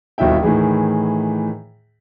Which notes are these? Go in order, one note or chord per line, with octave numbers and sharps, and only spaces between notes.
G1 D#2 B2 E4 E5 G5
A2 D#3 E3 G#4